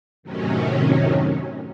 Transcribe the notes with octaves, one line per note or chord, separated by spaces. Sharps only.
F#2 A2 C3 D#3 F#3 C#4